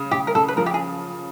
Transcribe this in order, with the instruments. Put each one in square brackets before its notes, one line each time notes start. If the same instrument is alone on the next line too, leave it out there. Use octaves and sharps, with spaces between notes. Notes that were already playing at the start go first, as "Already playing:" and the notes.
Already playing: [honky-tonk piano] C#3
[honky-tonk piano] C#3 [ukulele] G4
[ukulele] A#4
[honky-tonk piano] C#3 [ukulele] A4
[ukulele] B4
[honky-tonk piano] F3 [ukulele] A#4
[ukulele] G4
G#4